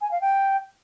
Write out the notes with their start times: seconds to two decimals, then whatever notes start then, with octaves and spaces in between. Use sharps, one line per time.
0.01 G#5
0.11 F5
0.21 G5